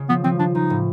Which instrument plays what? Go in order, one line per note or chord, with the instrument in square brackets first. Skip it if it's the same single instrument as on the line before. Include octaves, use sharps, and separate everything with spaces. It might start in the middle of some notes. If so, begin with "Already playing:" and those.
Already playing: [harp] C#3
[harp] F3 [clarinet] B3
[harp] F3 [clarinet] C4
[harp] F3 [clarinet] D4
[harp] F3 [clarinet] D#4
[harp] A2